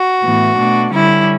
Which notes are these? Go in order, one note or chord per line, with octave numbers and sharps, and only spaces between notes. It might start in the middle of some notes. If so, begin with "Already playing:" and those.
Already playing: F#4
A2 E3 B3
B2 A3 D4
D3 G3 C#4 E4